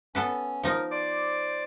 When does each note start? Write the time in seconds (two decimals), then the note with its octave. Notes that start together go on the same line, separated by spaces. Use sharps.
0.15 B3 C#4 A4 B4
0.63 F3 D#4 A#4
0.91 C5 D5 D6